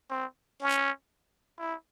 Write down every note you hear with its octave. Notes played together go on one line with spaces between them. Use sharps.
C4
C#4
E4